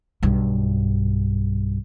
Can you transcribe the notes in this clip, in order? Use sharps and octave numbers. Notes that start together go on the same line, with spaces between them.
B1 G2